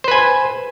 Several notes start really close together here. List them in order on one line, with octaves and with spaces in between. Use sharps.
C5 B4 G#5